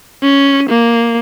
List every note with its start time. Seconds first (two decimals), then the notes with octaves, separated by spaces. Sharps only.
0.22 C#4
0.69 A#3